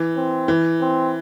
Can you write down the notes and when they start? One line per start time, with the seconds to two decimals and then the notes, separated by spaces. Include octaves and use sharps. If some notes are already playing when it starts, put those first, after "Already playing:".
Already playing: E3
0.16 C4
0.48 E3
0.81 C4